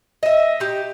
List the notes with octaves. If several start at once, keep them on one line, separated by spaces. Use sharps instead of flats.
D#5 E5
D#4 G4